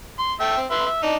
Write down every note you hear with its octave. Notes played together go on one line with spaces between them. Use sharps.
C6
A3 E5 G5
C4
B4 E5 C6
E5
D4 D#4